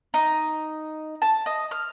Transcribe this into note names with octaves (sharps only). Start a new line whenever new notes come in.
D#4
A5
D#5
F6